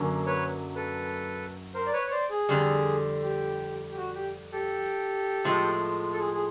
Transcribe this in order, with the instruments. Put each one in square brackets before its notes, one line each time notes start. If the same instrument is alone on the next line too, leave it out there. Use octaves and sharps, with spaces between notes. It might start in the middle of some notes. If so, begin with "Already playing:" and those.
Already playing: [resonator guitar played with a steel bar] F#2 D3 F#3 A#3 C#4
[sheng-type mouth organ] B4 C#5
A4 B4
A#4 C5
D5
B4 C#5
C#5
C5 D5
G#4
[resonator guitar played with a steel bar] F2 D3 G3
[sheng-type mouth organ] G4
G4
F#4
G4
G4 A4
[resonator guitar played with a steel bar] A2 F3 G#3
[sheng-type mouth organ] A4
G#4
G#4